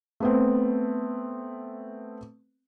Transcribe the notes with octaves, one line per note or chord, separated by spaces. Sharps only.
A3 B3 C4